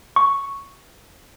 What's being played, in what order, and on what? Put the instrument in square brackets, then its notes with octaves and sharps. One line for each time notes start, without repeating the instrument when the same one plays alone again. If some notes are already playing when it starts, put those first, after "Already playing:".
[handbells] C#6